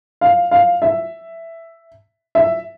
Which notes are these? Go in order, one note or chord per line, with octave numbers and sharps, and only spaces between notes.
F5
F5
E5
E5